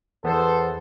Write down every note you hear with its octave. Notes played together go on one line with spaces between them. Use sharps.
E2 B3 A4 B4 C5